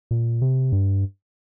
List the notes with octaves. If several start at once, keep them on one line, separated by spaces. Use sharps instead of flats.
A#2
C3
G2